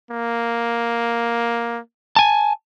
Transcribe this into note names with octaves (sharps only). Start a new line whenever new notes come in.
A#3
G#5 A5